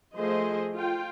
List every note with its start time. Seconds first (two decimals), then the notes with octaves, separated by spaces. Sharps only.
0.17 F3 A3 G#4 C5 D#5
0.75 F4 G5